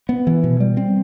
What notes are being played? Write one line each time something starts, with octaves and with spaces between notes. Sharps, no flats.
B3
E3
B2
G3
C4